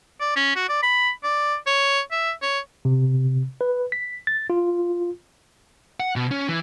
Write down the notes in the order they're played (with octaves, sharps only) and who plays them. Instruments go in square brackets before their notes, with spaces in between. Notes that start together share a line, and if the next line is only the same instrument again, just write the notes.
[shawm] D5
C#4
F#4
D5
B5
D5
C#5
E5
C#5
[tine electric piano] C3
B4
B6
A6
F4
[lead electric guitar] F#5
B2
C#4
E3